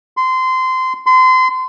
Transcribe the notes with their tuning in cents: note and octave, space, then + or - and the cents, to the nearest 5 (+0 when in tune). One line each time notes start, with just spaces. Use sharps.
C6 -20
C6 -30